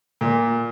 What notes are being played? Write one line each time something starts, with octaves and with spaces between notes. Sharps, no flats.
A#2